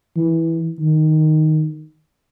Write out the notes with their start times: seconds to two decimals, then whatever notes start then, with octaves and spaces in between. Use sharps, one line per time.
0.16 E3
0.80 D#3